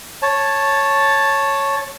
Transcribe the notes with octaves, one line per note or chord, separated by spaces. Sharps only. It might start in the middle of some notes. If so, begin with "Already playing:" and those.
C#5 A5